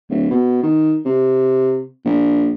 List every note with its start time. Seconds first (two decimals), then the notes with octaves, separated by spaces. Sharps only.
0.10 D1
0.31 B2
0.63 D#3
1.05 C3
2.05 A#1